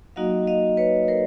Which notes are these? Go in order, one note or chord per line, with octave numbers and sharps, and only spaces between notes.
F#3 A#3 D#4 F#4 D#5 F5
D#5 F5
B4 C#5
A#4 C5